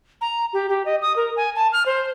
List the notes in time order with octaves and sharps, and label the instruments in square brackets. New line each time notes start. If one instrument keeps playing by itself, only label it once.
[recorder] A#5
G4
G4
D#5
D#6
A#4
G#5
A5
F6
C5